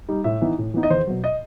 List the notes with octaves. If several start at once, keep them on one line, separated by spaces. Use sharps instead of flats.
G3 D#4
A2 E5
E3 B3 D#4
A2
E3 B3 D#4
D#5
E2 C5
B2 F#3
D#5